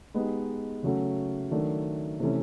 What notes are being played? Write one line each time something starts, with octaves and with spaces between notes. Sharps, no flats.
G#3 B3 D#4 G4
C#3 F#3 A3 C#4 F#4
D#3 F#3 A3 D4
C3 E3 A3 C#4